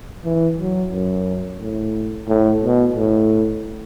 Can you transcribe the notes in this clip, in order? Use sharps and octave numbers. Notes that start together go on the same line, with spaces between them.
E3
F#3
F#2
A2
A2
B2
A2